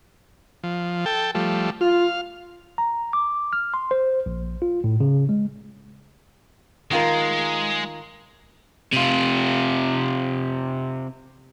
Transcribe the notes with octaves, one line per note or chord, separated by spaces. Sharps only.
F3
A4 G5
F3 G3 A3
F4 F5
A#5
D6
F6
C6
C5
A#1
F4
A2
C#3
G#3
D#3 G#3 F4 A#4
C3 F4